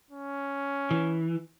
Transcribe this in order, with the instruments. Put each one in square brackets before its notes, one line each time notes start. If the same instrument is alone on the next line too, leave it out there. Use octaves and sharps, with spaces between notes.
[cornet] C#4
[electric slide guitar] E3